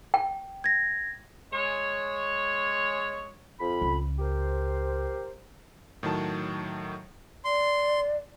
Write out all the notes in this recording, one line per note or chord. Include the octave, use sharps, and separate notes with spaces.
G5
G#6 A#6
G#3 C#5
F2 B5
C#2
G4 A#4 C5
A2 D#3 F#3 A5
D5 C6